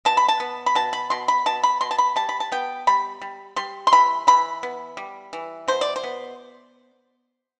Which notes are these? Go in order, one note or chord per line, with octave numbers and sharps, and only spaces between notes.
B2 A5
B5
A5
B3
B5
B2 A5
B5
B2 C6
B5
B2 A5
B5
B2 C6
A5
B5
G3 A5
B5
A5
B3 G5
G3 B5
G3
G3 C6
C6
E3 B5
E3 B5
B3
G3
E3
B2 C5
D5
C5
B3